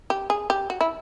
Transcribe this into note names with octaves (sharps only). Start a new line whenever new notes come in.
G4
G#4
G4
F#4
E4